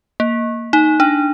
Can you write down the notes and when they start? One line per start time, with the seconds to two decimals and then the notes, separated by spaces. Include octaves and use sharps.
0.20 A#3
0.73 D#4
1.00 D4